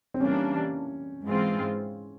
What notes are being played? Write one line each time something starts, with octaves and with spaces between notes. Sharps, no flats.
C4
E3 G3 A#3 C#4 D4
G#2 E3 G#3 C4 F4